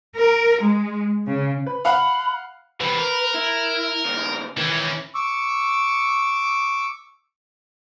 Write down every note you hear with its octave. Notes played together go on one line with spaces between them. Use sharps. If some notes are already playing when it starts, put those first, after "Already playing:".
A#4
G#3
C#3
B4
F5 F#5 B5
C3 E3 B4
A#4
E4
G2 C#3
D#3 E3 C#4
C#6 D6 E6